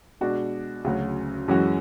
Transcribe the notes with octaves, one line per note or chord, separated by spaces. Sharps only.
B2 G#3 D4 F#4
D2 C#3 F#3 C#4 F#4
F#2 E3 G#3 C#4 F#4